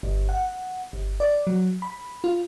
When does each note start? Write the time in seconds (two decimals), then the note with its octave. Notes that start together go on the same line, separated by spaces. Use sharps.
0.03 G1
0.29 F#5
0.93 G1
1.20 D5
1.47 F#3
1.82 B5
2.24 F4